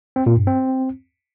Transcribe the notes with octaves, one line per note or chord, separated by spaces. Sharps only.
C4
A#2
G2
C4